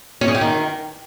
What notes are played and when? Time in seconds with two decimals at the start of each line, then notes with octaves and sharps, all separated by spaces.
0.21 C#4
0.28 G#4
0.35 G4
0.41 D#3